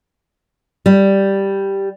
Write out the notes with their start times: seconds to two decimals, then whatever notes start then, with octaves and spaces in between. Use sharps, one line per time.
0.86 G3